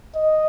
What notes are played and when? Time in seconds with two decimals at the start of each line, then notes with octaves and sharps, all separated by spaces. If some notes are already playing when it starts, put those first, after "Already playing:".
0.16 D#5